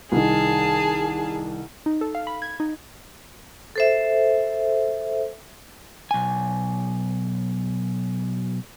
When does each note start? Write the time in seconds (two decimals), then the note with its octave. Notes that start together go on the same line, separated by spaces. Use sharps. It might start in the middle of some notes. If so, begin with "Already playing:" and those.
0.12 C2 D#3 G#4 A5
1.86 D#4
2.01 A4
2.15 F5
2.27 B5
2.42 G#6
2.60 D#4
3.76 A4 C5 E5
6.11 B1 G#5